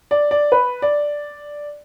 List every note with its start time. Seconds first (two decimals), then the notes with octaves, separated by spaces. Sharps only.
0.11 D5
0.31 D5
0.52 B4
0.82 D5